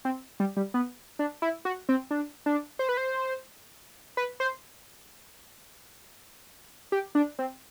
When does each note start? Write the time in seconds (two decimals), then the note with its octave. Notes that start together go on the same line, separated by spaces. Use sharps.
0.05 C4
0.40 G3
0.57 G3
0.74 B3
1.19 D4
1.42 E4
1.65 F#4
1.89 C4
2.11 D4
2.46 D4
2.79 C5
2.89 B4
2.97 C5
4.17 B4
4.40 C5
6.92 G4
7.15 D4
7.39 C4